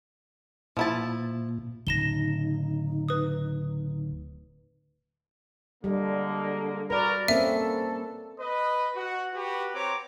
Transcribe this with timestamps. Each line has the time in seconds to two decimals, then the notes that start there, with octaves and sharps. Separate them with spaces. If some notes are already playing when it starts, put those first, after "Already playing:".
0.77 A#2 F3 E4 A5
1.87 D1 C#3 D#4 A#6 E7 G7
3.09 B4 D#6
5.84 D3 G3 G#3 A#3
6.90 F#4 A#4 B4 D5
7.28 A#3 C4 C#4 A4 E5
8.40 B4 D#5
8.96 F#4 F#5
9.34 F#4 G4 B4
9.74 C4 C#5 A#5 D6